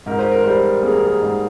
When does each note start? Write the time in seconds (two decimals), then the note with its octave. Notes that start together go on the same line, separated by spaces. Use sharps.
0.06 G#2 A#4
0.19 C5
0.32 A#4
0.44 G3 C5
0.56 A#4
0.83 A#3 G#4
0.92 A#4
1.01 G#4
1.21 G#2